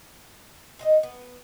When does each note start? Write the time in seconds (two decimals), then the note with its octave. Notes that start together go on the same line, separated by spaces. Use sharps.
0.79 C4 D#4 D#5
1.03 B3